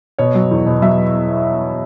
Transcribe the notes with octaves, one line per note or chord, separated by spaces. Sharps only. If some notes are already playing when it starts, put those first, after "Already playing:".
B2 C#5
F#3
E2
B2
F#3 E5